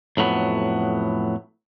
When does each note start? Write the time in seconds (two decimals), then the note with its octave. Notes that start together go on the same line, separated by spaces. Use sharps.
0.17 F2 A2 F#3 B3